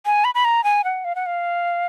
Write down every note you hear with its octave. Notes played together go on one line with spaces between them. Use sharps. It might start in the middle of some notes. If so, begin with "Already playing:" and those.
G#5
B5
B5
A#5
G#5
F#5
F5
F#5
F5